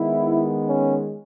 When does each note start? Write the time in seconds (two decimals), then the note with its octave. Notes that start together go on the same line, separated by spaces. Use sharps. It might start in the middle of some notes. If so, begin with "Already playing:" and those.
Already playing: D#3 G#3 B3 E4
0.68 C#4